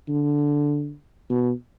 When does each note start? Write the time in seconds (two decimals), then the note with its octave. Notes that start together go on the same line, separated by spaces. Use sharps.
0.08 D3
1.29 B2